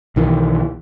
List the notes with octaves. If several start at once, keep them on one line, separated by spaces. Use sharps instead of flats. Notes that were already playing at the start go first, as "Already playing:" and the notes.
B1 D#3 E3